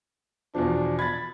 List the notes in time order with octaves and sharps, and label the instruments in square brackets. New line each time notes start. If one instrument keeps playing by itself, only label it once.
[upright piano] E2 B2 F3 [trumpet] D4
[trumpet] B5 [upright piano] G#6 A6